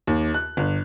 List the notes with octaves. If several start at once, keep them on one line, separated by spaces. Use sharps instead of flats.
D#2
F#6
G1